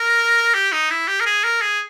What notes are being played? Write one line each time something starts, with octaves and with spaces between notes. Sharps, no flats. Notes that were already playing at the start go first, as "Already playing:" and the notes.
Already playing: A#4
G4
D#4
E4
G4
A#4
G#4
A#4
G#4